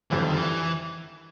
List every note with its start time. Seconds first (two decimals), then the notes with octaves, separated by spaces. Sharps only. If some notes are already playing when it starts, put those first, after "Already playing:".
0.11 F#1 F2 D3 E3 G3 C4
0.24 D#3
0.36 E3